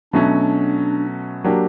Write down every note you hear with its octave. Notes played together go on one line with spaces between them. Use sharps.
B2 F#3 A3 C#4 D4 F#4
F#3 A#3 D4 G4